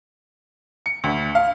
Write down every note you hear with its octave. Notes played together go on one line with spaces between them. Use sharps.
C#7
D2
F5